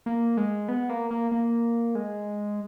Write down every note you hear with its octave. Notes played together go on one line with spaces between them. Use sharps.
A#3
G#3
B3
A#3
A#3
A#3
G#3